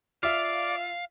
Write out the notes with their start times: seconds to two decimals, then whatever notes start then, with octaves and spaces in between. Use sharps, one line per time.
0.23 F4 D5 E5 F5